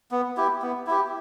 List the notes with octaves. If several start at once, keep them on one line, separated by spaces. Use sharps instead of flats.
B3
E4 G4
B3
E4 G4